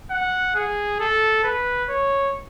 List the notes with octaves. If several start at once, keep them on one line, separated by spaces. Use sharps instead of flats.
F#5
G#4
A4
B4
C#5